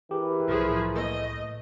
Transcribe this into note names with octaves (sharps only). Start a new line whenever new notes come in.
E3 G4 G#4 A#4 B4
C2 A2 F3 G#4
A3 D#5